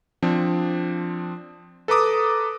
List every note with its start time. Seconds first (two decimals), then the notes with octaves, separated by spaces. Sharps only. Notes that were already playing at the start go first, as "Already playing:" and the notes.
0.22 F3 C4 D4
1.88 A4 B4 A#5 D6 D#6